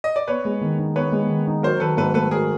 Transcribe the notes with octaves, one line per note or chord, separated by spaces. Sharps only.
D#5
D5
B3 B4 C#5
G#3
D#3
D#4
B3 B4 C#5
G#3
D#3
D#4
F#3 A#4 C5
D#3 A4 B4
G#2 A4 B4
A3 A4 B4
F#3 G#4 A#4